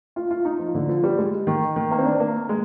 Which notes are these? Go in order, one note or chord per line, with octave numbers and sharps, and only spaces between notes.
F4
F4
D#4
F3
D3
F3
G3
G#3
D#3
D#3
A#3
C4
D4
A#3
G#3